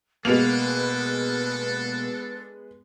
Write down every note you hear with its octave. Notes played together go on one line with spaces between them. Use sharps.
B2 G#3 A#3 B3 D4 A4 B4 F7